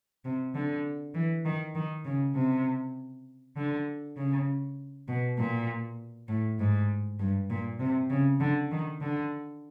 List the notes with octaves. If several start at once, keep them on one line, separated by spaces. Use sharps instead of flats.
C3
D3
E3
D#3
D#3
C#3
C3
D3
C#3
B2
A#2
A2
G#2
G2
A#2
C3
C#3
D3
D#3
D3